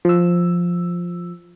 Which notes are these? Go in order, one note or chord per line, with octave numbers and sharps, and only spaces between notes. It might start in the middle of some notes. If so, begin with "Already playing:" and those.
F3 E6